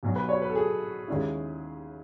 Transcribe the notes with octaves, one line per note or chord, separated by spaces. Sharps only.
B1 B2 F#3
B4
C#5
B4
A4
G#4
D#2 C#3 G#3 C#4 E4